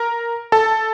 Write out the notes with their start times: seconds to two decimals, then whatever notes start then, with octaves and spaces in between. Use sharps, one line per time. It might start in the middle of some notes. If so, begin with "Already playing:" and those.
Already playing: A#4 A#5
0.52 A4 A5